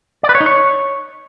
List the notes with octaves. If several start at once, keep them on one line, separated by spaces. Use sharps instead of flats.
D5
B4
C#5
D#4
C#5